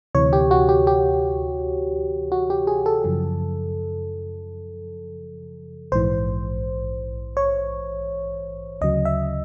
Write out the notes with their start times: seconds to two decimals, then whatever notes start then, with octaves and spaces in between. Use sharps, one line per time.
0.15 D2 C3 E3 C#5
0.33 G4
0.51 F#4
0.69 G4
0.87 G4
2.32 F#4
2.50 G4
2.67 G#4
2.86 A4
3.04 F#2 C#3 F3
5.92 A#1 G#2 E3 C5
7.37 C#5
8.81 D2 C#3 F#3 D#5
9.05 E5